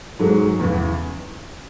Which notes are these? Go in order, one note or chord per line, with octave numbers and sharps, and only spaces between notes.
G#2 F#3 G#3
E2 C#3 E3